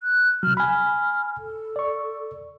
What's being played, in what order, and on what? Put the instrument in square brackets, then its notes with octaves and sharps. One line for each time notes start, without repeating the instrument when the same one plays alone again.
[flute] F#6
[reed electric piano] C3 F#3 [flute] F6
[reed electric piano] G#5 B5 [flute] F6
[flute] A4
[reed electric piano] D5 C#6